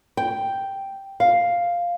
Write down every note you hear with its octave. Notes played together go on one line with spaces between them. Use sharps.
G5
F5